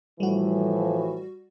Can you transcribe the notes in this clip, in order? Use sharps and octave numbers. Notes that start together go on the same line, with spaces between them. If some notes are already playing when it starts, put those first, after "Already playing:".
A2 E3 F3 G3 F#4